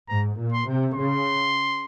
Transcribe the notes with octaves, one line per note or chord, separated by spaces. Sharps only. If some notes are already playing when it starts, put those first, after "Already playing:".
G#2 A#5
A#2
C6
C3
C#3 C6